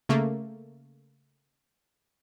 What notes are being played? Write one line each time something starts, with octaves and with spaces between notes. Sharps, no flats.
C#3 A3 A#3